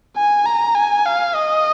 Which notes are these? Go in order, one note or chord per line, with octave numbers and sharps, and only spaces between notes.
G#5
A#5
G#5
F5
D#5